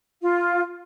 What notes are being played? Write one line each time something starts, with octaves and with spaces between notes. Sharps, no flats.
F4